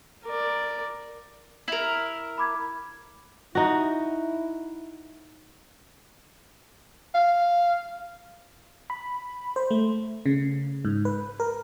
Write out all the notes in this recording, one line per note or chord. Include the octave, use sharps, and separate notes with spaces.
A#4 D5
E4 A#4
B5 D6 G#6
D#4 E4 F#4
F5
B5
C5
A3
C#3
G#2
B4
A#4